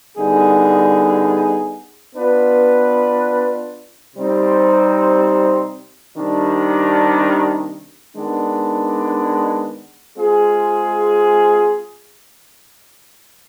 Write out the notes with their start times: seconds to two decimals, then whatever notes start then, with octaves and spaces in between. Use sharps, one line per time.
0.16 D3 G3 B3 D#4 G#4
2.15 B3 D4 F4 B4
4.16 C3 G3 C4 D#4
6.17 C3 D#3 G3 D4
8.16 D#3 G#3 B3 D4
10.16 G#3 C4 F4 G#4